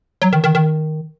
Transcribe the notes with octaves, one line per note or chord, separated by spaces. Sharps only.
F#3
D#3
D#3
D#3